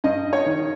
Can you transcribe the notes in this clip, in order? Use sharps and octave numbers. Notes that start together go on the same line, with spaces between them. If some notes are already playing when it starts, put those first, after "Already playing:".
G2 D#5
C#5
D#3